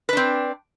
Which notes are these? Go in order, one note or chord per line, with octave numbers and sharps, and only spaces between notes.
C4 D4 B4